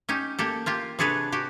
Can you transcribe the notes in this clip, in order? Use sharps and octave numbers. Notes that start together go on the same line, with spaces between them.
C#4 D#4 G4
A#3 G4 A4
A#3 F4 G4
C3 D4 G#4 A4 B4 C#5
F#4 G4